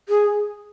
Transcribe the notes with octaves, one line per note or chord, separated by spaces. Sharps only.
G#4